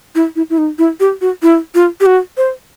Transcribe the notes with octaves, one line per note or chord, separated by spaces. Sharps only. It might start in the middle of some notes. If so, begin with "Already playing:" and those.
E4
E4
E4
D#4
E4
G4
F#4
E4
F4
G4
F#4
C5